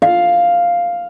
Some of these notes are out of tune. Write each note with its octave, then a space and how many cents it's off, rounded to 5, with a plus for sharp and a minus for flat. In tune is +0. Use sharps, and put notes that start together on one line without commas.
F5 +0